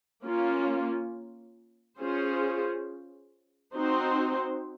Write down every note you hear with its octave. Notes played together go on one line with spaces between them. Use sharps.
A#3 C#4 F4
C#4 F4 G#4 C5
C4 D#4 F#4 C5